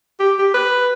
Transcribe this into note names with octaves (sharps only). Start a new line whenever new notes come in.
G4
G4
B4